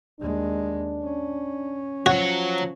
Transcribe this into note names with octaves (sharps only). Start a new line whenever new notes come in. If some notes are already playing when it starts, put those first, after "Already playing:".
D#2 G#3 D4
C#4
F3 F#3 F#4 C#5